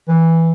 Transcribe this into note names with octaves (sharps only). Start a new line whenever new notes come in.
E3